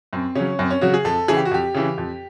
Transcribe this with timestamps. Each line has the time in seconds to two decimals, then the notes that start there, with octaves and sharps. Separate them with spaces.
0.13 F#2 C4
0.35 C#3 F#3 C#4
0.59 F#2 C4
0.71 C#4
0.81 C#3 F#3 F#4
0.94 G#4
1.05 F2 A4
1.28 C#3 E3 G#4
1.37 G4
1.45 F#4
1.51 F2 G4
1.74 C#3 E3
1.98 F2